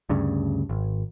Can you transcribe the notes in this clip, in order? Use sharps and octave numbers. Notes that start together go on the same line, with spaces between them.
D2 G2 C#3
G#1